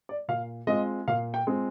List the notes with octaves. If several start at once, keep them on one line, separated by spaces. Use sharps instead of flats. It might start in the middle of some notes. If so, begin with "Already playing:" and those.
D5
A#2 F5
G#3 C4 F4 D#5
A#2 F5
G5
G#3 C4 F4